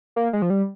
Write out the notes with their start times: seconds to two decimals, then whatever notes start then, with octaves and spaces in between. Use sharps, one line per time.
0.16 A#3
0.33 G#3
0.42 F3
0.50 G3